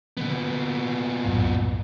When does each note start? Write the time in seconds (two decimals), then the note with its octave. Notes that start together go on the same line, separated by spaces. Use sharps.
0.17 A#2 D3 B3
1.25 C2 F#2 A2